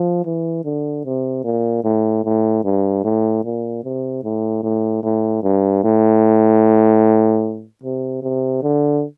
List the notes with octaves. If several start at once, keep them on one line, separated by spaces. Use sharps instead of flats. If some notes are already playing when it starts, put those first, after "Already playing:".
Already playing: F3
E3
D3
C3
A#2
A2
A2
G2
A2
A#2
C3
A2
A2
A2
G2
A2
C3
C3
D3